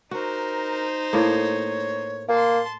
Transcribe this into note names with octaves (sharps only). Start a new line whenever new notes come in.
D#4 F#4 A#4 C5
A2 A#3 C#5
A#3 A5 C6